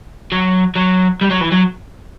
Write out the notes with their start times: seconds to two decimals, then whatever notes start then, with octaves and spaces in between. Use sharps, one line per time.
0.32 F#3
0.76 F#3
1.21 G3
1.30 F#3
1.41 E3
1.52 F#3